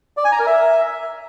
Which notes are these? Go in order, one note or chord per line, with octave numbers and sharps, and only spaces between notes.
D5
G#5
A#5
A#4
E5